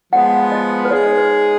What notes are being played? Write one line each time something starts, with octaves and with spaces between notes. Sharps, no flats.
F3 G#3 B3 F#5
D#5
B4
G#3 D#4 G#4 C#5
C#5
B4